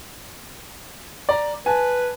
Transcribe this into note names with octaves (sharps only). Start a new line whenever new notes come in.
D5 A#5
B4 G#5 A5